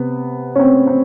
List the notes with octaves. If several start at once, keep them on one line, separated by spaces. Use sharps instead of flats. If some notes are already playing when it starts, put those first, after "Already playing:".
Already playing: C3 B3
C#4
C4
C4